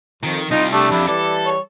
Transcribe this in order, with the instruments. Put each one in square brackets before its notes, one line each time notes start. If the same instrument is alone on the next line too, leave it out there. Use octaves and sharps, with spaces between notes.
[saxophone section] F2 [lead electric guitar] D#3
[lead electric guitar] C2 G3 [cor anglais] D#4 [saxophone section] F4
[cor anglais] A3 [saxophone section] D4 G4
[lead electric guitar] F2 [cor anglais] E4
[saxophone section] E3 G3 [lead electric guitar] A4 [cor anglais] D5
[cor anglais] C#5